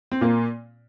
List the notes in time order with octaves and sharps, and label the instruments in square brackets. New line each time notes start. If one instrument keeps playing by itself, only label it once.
[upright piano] C4
A#2 A#3